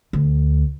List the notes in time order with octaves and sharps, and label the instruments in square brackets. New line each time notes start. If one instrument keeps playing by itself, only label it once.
[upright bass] D2